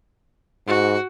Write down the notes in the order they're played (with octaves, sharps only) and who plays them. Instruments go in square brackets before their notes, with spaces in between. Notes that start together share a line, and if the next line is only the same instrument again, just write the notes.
[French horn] G#2 [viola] F#4